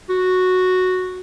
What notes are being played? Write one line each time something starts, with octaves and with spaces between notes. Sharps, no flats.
F#4